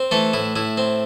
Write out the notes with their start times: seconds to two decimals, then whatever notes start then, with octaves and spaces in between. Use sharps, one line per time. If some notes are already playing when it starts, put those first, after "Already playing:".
Already playing: C4
0.11 E3 A3 A4
0.33 A2 E4
0.56 A2 E4
0.77 C4